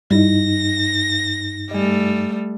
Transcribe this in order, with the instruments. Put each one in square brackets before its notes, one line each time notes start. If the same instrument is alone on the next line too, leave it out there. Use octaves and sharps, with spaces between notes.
[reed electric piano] G2 D#4 [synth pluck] G3 E4 [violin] A#6
[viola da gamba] G3 A3 [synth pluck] D#5 G#5